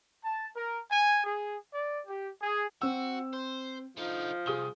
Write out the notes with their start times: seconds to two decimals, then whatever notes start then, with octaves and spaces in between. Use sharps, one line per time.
0.23 A5
0.55 A#4
0.90 G#5
1.23 G#4
1.72 D5
2.06 G4
2.40 G#4
2.82 C4 F#4 E6
3.33 C5
3.97 D3 F3 D#4
4.46 C2 G#4 D#6 G7